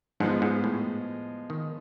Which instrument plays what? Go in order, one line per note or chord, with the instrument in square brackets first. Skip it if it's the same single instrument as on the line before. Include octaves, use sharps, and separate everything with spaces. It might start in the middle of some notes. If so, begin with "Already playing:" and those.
[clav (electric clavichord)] G#2 [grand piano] F3 G#3 B3 D#4
[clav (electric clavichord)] G#2
A2
D#3